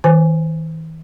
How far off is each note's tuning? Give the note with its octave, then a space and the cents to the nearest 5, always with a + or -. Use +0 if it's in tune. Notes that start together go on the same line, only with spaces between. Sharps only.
E3 -45 C5 -25 G#5 +0